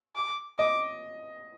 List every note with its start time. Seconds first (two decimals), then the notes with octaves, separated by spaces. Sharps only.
0.15 D6
0.59 D#5 D6